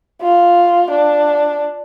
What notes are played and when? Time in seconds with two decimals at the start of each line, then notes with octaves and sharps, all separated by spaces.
0.22 F4
0.90 D4